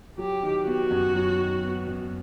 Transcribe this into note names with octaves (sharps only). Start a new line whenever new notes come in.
F#3 G4
D#3
B3 F#4
F#2
F#3
D#3
B3
F#2